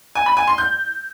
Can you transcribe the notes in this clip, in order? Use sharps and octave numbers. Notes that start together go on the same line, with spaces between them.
G#5
B5
G#5
C6
G6